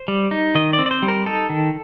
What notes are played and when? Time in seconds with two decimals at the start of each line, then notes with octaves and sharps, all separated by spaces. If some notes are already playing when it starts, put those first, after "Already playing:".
Already playing: C5
0.08 G3
0.31 D#4
0.55 D#3 D#5
0.73 D5
0.79 C4
0.86 D5
0.91 C5
1.02 G3
1.08 A#4
1.26 D#4 A4
1.50 D#3